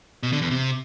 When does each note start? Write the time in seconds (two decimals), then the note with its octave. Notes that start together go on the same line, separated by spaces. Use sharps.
0.23 B2
0.32 D3
0.42 E2
0.51 C3